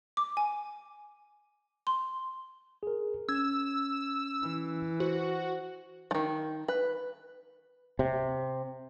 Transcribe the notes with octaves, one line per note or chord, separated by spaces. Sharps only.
D6
G#5
C6
G#4 A#4
C#4 E6 G#6
E3
F#4 C5
D#3 F3
B4
C3